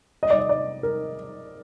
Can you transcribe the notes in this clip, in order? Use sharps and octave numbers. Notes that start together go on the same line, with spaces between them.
D#5
D5
D#5
D5
A#4